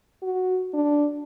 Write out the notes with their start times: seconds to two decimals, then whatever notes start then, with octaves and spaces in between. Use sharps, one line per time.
0.22 F#4
0.74 D4